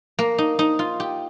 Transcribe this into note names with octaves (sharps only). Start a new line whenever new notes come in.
A#3
D#4
D#4
F4
G4